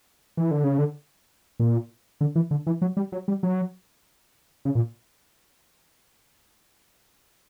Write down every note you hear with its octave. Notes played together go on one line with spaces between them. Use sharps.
E3
D3
C#3
D3
A#2
D3
E3
D3
E3
F#3
G3
F#3
G3
F#3
C#3
A#2